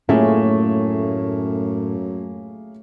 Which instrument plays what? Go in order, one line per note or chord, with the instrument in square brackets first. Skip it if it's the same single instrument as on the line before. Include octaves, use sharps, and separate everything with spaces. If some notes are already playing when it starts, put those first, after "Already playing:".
[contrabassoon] F#2 [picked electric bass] A2 [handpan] A3 C#4 F4 [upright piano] A#3 G#4 E5